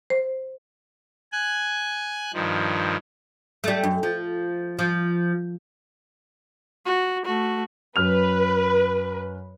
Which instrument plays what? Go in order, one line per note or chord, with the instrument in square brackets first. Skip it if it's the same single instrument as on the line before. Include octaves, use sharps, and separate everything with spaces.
[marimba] C5
[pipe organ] G#5 F#6
G2 D#3 F3
[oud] G3 A3
F#2
F3
F3
[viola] F#4
A3 F#4
[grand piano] F#2 F6 F7 [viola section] B4